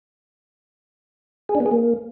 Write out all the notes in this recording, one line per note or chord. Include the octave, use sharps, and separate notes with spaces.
G#4
D4
B3
G#4
A#3